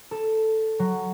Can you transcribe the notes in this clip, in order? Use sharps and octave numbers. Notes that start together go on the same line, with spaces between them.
A4
F#3